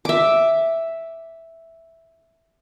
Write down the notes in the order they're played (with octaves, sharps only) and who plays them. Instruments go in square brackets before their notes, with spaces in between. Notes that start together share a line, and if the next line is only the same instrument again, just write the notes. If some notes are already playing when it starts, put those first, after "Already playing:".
[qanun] E5 D6